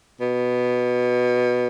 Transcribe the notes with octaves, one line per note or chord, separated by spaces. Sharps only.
B2